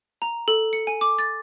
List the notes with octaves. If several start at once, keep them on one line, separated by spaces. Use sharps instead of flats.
A#5
A4
C#7
G#5
D6
A6